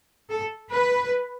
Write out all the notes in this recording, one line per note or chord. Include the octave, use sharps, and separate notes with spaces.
A4
B4